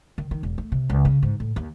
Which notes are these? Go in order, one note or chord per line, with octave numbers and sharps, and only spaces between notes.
D#3
D#3
E1
A3
C3
C#2
C#3
G#2
A2
D#2